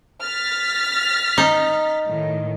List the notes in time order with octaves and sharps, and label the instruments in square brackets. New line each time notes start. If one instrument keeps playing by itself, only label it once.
[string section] F6 A6 B6
[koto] D#4
[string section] A2 D#3